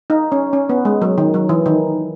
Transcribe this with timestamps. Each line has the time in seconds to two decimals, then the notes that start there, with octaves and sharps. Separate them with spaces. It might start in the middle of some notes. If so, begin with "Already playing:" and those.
0.10 D#4
0.32 C#4
0.53 C#4
0.69 B3
0.85 G#3
1.02 F#3
1.18 D#3
1.34 F#3
1.49 E3
1.66 D#3